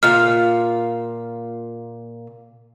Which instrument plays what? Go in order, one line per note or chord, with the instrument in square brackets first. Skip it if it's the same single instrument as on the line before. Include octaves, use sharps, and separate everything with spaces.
[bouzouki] A#2 F4 F5 [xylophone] F6